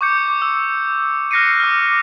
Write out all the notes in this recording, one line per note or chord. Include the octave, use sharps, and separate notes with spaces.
C#6 D6 G6 C#7
E6
F6 F#6 A#6 C7 C#7 D#7
D6 F6